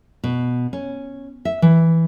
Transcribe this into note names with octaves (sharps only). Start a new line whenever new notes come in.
B2
C#4
E5
E3